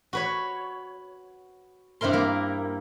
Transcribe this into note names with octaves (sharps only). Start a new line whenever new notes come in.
F#4 B4 C#5
G2 C3 E4 A#4 C6
A#3 A#4